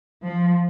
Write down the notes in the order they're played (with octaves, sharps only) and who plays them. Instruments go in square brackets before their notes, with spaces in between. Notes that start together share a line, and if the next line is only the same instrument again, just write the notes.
[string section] F3